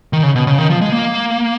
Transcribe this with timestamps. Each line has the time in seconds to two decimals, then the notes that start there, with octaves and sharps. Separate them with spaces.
0.13 D#3
0.23 C#3
0.36 B2
0.47 C#3
0.58 D#3
0.70 F3
0.81 G#3
0.92 A#3